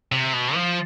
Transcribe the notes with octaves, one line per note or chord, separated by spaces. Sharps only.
C3
B2
F3